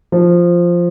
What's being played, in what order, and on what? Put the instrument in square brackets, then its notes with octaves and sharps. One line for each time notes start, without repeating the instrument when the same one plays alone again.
[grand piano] F3